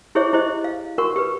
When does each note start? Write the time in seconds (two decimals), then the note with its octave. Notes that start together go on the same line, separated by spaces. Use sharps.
0.15 E4 G4 G#4 C5 C#5 E5
0.33 E4 G4 C5 D#5
0.64 F5
0.98 F#4 A#4 F#5 C#6
1.16 G4 B4